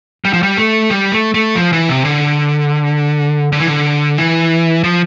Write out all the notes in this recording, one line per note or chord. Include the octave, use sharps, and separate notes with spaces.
G3
F3
G3
A3
G3
A3
A3
F3
E3
C3
D3
D3
E3
D3
E3
F3